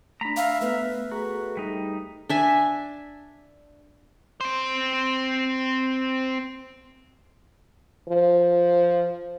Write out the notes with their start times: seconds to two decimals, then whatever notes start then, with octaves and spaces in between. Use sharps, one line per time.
0.21 A3 D4 A#5 B5
0.37 E5 F5
0.61 A3 B3 B4 F6
1.11 A3 F#4 G#4 A#5
1.57 G3 D#4
2.29 D4 E5 G#5
4.41 C4 C5
8.09 F3